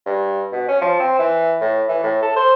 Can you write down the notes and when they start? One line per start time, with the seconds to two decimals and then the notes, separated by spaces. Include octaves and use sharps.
0.06 G2
0.52 B2
0.69 C#4
0.82 F3
1.00 C4
1.19 E3
1.61 A2
1.88 E3
2.03 A2
2.23 A4
2.36 C5